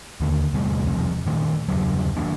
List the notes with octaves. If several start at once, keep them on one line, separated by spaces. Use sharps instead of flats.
D#2 D3 A#3
E2 C3 G3 A3
E1 C2 F2
A#2 D#3 A3 D4
E2 G2 C#3 F#3
D#3 F#3 A#3 D4